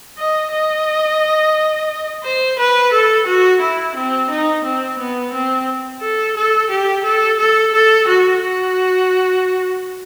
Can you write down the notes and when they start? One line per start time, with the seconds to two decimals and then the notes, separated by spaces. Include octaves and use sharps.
0.18 D#5
0.52 D#5
2.24 C5
2.58 B4
2.92 A4
3.26 F#4
3.60 E4
3.95 C4
4.30 D#4
4.64 C4
4.98 B3
5.33 C4
6.01 A4
6.36 A4
6.70 G4
7.04 A4
7.39 A4
7.73 A4
8.07 F#4
8.42 F#4